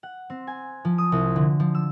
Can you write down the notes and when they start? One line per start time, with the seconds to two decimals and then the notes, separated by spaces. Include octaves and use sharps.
0.03 F#5
0.30 C4
0.47 G#5
0.85 F3
0.98 D#6
1.12 C2
1.36 D3
1.60 F3
1.75 E6